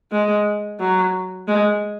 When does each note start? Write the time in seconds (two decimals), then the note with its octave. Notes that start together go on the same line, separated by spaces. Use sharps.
0.12 G#3
0.80 F#3
1.48 G#3